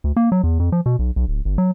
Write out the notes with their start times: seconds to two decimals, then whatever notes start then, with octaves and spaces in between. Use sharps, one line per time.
0.04 D2
0.16 A#3
0.32 F#3
0.44 E2
0.60 F2
0.72 F3
0.86 B2
0.99 B1
1.16 B1
1.28 D1
1.45 G1
1.58 F#3